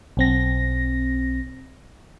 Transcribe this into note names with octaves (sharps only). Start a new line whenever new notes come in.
B1 C4 A#6